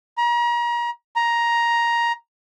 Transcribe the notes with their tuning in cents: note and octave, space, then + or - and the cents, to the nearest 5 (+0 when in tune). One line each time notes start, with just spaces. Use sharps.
A#5 +35
A#5 +10